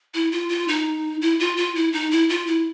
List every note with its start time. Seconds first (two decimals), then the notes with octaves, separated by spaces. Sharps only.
0.14 E4
0.32 F4
0.49 F4
0.68 D#4
1.22 E4
1.40 F4
1.57 F4
1.75 E4
1.92 D#4
2.11 E4
2.29 F4
2.47 E4